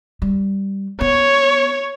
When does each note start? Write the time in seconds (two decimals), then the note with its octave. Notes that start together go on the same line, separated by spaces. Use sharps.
0.22 G3
1.01 B3 C#5